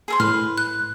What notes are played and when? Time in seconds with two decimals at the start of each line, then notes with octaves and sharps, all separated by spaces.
0.08 G#4 A4 C5
0.20 A2 B4 F6
0.58 F#6